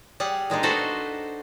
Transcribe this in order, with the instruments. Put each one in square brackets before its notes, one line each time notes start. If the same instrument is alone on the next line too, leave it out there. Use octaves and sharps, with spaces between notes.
[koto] G3 G#4 F#5
A#2 G#3 D4 D#4
F#4 A4 B4 C5